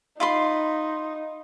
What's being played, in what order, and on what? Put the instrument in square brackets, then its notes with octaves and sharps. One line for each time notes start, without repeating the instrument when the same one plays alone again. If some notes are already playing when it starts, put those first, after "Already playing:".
[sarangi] D#4 [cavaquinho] F4 B5 C6